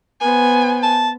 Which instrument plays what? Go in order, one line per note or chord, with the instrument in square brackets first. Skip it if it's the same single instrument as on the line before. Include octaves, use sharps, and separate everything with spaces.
[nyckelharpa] B3 C5 [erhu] G#5
[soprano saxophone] A5